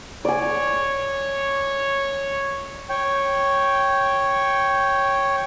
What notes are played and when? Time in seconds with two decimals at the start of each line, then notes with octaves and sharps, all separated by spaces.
0.25 C#5 D5 G#5
2.89 C#5 G5